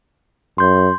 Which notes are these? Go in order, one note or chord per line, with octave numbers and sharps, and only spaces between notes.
F#2 C6 G6